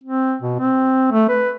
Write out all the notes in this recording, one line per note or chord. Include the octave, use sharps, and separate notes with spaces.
C4
B2
C4
A3
B4